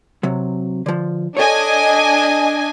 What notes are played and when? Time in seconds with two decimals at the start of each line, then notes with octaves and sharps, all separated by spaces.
0.23 C3 F#3
0.86 D3 F3
1.37 D4 A4 C#5 D#5 G#5